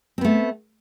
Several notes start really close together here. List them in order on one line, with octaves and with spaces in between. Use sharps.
C4 B3 A3